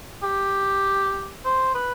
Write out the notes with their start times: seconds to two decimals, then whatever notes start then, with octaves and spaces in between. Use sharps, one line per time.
0.23 G4
1.45 C5
1.75 B4